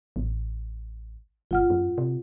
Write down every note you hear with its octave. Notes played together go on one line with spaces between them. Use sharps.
A1
G1 F4 F#5 F6
F#2
C3